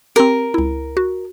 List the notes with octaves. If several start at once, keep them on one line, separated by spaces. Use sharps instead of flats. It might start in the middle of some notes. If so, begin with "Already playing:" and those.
C4 G4 A#4
C#2 E4
F#4